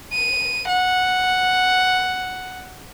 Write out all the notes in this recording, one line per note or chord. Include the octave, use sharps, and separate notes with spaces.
D#7
F#5